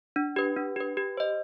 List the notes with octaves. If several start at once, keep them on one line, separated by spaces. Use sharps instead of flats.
D4
G4 B4
D4
G4 B4
G4
C5 D#5